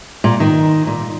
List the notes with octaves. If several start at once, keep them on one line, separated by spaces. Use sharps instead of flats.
A#2
D#3
A#2